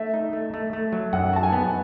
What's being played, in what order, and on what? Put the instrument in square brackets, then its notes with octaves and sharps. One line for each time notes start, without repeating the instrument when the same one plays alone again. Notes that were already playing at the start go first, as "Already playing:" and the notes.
Already playing: [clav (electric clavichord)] A3 [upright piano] E5
[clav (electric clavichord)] D#4
A3
A3
A3
F#3
[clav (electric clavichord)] F#2 [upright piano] F#5
[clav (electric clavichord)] F#4 [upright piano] A5
[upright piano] G#5
[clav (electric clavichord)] B3